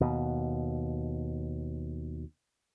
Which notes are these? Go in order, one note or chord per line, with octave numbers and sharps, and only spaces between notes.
D#2 B2